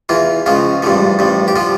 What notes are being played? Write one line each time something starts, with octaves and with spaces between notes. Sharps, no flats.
E2 E3 F4
C#2 C#3 F3 F4
A1 G2 D3 F3
A1 G2 F3
G4
D3 F3 F4